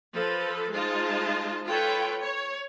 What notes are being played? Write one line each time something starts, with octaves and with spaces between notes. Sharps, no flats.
F3 A4 B4
G#3 D#4 F4 C5 A5
F4 A4 B4 C#5 G5
C#5